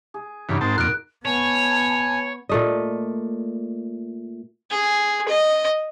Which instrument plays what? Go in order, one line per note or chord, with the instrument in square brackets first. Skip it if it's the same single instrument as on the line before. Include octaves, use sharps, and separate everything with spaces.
[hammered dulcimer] G#4
[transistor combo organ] G2 C#3 E3 [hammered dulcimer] D#4 F#4 B4
[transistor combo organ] G#2 C4 A5 [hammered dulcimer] A#4
[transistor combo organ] F2 A#2 [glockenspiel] F#6 D7
[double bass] B3 [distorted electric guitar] C#5 [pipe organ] G#5 [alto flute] A5
[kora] A#2 A3 D#5
[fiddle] G#4
D#5